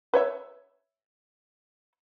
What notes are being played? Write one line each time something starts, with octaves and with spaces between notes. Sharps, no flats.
B4 C#5 E5